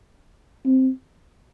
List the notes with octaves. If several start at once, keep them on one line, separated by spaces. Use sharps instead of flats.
C4